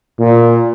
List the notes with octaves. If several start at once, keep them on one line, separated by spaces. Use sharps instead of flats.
A#2